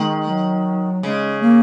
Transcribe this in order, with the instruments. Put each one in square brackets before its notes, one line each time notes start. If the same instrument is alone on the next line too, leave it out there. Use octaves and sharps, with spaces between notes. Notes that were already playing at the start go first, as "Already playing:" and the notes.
Already playing: [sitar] D#3 [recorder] G#3
[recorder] F#3
[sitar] C#3 [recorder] G#3
[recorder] A#3